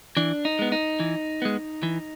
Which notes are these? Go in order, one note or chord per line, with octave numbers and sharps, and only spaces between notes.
E3 D4
D#4
G#3 B3
D#4
E3
G#3 B3
E3